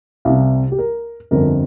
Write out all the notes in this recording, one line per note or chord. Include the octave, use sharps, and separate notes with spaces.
C2 C3 F5
G4
A#4
G1 F2 D3 A#4